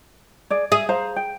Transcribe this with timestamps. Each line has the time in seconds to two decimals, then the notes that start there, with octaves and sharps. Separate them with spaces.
0.50 G#4 D5
0.72 G#4 E5
0.89 C5 F5 A#5
1.16 G5